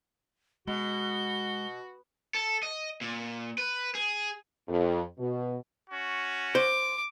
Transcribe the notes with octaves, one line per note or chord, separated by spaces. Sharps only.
B2 G#3 F#4 G7
A4
D#5
A#2
B4
G#4
F2
B2
C#4 F#4
C5 D6